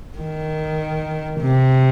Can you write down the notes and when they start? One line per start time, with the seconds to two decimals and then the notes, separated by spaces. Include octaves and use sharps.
0.19 D#3
1.40 C3